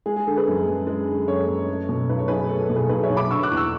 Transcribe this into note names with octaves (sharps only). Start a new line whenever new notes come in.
G#3 G#4
G#4
D3 A4
G#4 B4
F#2
F#2
G#3
D3
F#2 A4 C#5
F#2
A3
B2
B1 B4
C#5
B1 G#4 B4
A3 A4
A4
B2
G#4 B4
B1 G#4 B4
C#5 E5
B1
B5 D6
D3 C#6 E6
D6 F#6
E2
C#6 E6